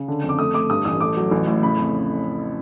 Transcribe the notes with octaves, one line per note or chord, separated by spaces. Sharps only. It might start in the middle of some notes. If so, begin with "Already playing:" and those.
Already playing: C#3
D3
F2
D6
A3 D#6
A3 D6
G2 D#6
A1 D#6
A3 D6
F#3
A1
A2
C#3 B5
F2